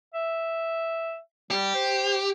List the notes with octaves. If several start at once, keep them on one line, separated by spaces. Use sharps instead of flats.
E5
G3 G4
C5